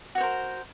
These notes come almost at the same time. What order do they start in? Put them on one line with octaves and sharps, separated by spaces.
F#4 C#5 C5 A#4